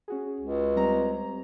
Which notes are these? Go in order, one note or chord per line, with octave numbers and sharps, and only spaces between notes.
C#4 F#4 G#4
C#2
G3 C4 A#5